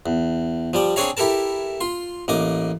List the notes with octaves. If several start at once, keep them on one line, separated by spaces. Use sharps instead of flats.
E2
F3 G3 D5
C4 D4 G#4 C#5 F5 A#5
E4 G4 A4 A#4 A5
F4 C6
A1 A#3 D#5 D6